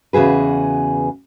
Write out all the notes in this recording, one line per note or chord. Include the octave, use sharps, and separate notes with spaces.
E2 C#3 F#4 G#4 B4